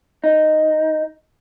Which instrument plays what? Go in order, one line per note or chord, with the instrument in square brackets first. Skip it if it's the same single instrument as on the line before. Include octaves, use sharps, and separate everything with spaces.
[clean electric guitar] D#4